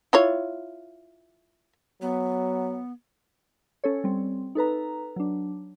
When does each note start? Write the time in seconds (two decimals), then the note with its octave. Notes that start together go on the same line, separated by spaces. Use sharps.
0.13 E4 F4 C#5
2.02 F#3 B3
3.84 C#4 A4 C#5
4.04 G3 C4
4.55 D#4 A4 B4 A#5
5.16 F#3 D4